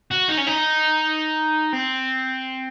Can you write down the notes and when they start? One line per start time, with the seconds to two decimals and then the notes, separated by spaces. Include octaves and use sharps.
0.11 F#4
0.29 D#4
0.38 C#4
0.47 D#4
1.73 C4